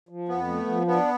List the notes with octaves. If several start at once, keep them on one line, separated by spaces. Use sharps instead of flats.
F3
F2 B3
A3
F3
B3 D4